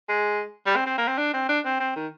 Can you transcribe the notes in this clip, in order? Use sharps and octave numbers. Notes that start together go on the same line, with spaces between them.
G#3
G3
C4
C4
A#3
C4
D4
C4
D4
C4
C4
D#3